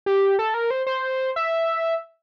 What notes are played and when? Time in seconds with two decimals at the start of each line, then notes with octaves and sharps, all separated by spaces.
0.06 G4
0.39 A4
0.54 A#4
0.71 C5
0.87 C5
1.36 E5